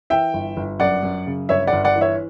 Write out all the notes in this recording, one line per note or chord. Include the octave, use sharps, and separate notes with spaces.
E3 E5 G5
G1
G1
F#2 D5 F#5
F#2
C#3
G1 C#5 E5
D5 F#5
G1
D5 F#5
E3
C#5 E5